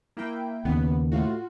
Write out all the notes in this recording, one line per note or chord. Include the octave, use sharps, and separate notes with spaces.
A#3 E4 G5
D#2 C#3 B3
A2 F4 F#4